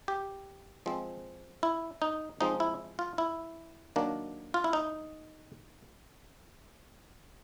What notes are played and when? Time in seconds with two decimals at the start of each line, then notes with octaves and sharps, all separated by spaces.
0.08 G4
0.86 F3 G#3 C4
1.63 E4
2.02 D#4
2.41 F3 G#3 C4 D#4
2.60 E4
2.99 F4
3.18 E4
3.96 D#3 F#3 A#3 D4
4.54 F4
4.64 E4
4.73 D#4